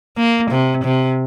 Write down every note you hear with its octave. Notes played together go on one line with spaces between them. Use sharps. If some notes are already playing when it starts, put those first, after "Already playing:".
A#3
C3
C3